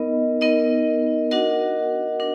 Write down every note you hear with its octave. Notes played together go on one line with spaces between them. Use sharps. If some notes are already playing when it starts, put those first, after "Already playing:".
Already playing: B3 D#4 A#4 D#5
B3 D#4 A#4 D#5
D4 F#4 A#4 D#5 F#5
D4 A#4